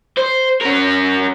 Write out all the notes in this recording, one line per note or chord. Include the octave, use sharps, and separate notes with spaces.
C5
C#4 A#4